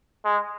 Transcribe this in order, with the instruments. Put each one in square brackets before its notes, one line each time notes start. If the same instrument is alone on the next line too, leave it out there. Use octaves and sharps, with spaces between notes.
[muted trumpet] G#3